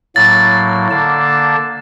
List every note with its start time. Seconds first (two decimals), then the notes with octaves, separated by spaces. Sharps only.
0.16 A2 F#3 A#3 A6
0.91 D3 A#3 A5